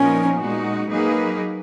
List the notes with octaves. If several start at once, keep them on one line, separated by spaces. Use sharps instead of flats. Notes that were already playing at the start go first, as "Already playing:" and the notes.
Already playing: A#2 F3 B3 C#4 D#4 A#4
A#2 G#3 D#4 F#4
F#3 A#3 D#4 G#4 B4